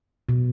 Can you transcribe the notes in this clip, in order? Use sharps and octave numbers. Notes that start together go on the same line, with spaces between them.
B2